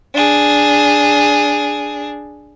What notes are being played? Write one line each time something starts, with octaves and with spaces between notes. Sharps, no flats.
D4 G#4